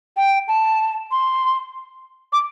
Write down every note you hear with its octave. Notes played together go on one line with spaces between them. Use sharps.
G5
A5
C6
D6